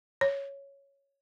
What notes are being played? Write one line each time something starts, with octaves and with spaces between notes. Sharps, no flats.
C#5